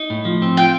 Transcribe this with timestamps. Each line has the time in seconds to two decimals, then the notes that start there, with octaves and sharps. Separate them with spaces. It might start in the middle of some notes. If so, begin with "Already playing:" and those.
Already playing: D#4
0.10 A2
0.25 F3
0.42 C4
0.57 F4 G5